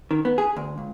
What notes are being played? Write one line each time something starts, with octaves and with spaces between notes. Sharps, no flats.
D#3
B3
G#4
D2
C#2